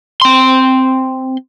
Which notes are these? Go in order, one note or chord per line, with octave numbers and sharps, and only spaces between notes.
C4 C6